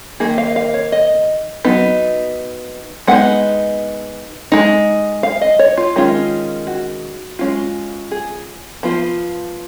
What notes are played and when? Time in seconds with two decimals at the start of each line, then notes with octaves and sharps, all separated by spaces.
0.20 D#3 F#3 A#3 D#4 G#4
0.38 F5
0.56 F5
0.74 C#5
0.92 D#5
1.65 F#3 B3 D#4
3.07 G#3 B3 D#4 F#5
4.52 G#3 D#4
5.23 F5
5.41 D#5
5.59 C#5
5.77 F4
5.96 D#3 G#3 C#4 F4
6.67 F#4
7.39 G#3 C#4 F4
8.11 G#4
8.83 F3 B3 F4